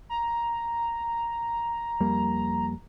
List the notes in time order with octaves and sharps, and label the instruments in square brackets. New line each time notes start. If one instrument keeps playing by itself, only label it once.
[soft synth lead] A#5
[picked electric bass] F2 G3 A#3